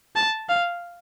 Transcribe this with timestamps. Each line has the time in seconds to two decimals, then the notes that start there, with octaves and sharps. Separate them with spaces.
0.16 A5
0.49 F5